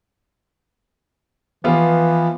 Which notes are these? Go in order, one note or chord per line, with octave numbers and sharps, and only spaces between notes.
E3 F3 B3 F4